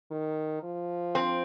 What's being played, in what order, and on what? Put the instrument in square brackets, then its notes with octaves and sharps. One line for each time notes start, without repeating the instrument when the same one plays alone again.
[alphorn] D#3
F3
[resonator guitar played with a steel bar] C4